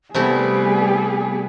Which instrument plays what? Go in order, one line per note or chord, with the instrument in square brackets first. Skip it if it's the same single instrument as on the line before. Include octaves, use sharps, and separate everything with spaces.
[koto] C3 A3 E4 [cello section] G3 B3 [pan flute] G4 [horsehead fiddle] G#4